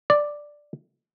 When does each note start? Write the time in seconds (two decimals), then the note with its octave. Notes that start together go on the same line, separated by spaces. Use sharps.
0.10 D5